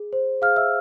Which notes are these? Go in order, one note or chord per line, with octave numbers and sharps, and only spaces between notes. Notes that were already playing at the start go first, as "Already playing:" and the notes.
Already playing: G#4
C5
G#4 F5 F6
E5 E6